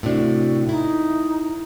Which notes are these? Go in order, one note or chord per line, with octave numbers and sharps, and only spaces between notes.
A2 C3 D4 F#4
D#4 E4